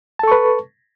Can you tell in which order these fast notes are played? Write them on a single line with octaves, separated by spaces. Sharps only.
A5 A4 C#6 B4